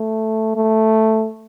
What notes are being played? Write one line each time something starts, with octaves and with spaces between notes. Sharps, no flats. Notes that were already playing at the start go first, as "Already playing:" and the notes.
Already playing: A3
A3